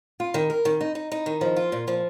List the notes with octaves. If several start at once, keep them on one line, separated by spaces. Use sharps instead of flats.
F4
D#3
A#4
D#3
D#4
D#4
D#4
D#3
F3
F4
A#2
F3